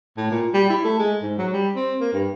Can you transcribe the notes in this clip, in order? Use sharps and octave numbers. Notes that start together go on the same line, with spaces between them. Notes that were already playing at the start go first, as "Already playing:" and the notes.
A2
A#2
G3
E4
A3
G#3
G#2
F#3
G3
C4
A#3
G2